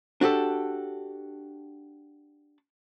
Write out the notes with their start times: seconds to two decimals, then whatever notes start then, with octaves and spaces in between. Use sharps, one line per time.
0.21 D4 F#4 G4 A4